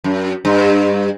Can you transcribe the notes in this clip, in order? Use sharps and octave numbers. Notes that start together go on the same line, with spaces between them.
F#2
G2